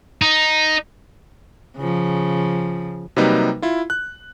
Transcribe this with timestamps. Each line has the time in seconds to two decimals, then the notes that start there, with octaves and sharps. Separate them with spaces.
0.22 D#4
1.77 C#3 F3
3.16 C3 F#3 G3 A#3 D#4 B4
3.62 E4 F4
3.90 F#6